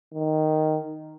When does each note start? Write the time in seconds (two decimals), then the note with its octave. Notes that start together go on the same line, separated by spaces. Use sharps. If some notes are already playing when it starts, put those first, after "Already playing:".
0.14 D#3